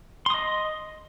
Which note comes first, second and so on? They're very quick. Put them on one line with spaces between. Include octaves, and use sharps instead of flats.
C6 D#6 D#5